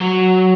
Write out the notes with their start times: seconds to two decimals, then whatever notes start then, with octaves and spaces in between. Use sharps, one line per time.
0.01 F#3